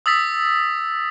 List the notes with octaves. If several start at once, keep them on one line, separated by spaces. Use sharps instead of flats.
D#6 E6 A6 B6